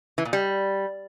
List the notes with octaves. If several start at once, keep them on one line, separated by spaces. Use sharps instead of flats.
E3
A#2
G3